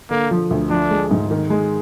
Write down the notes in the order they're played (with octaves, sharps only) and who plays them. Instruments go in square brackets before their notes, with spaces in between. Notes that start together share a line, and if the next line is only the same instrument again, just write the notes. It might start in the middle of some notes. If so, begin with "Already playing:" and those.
[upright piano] D3 [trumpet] A#3
[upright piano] F3
D2
[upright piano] F3 [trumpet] D4
[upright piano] G#3
G#2
D#3
G#3